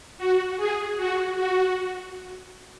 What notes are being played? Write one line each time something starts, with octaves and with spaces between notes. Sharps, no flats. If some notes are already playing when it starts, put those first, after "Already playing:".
F#4
G#4
F#4
F#4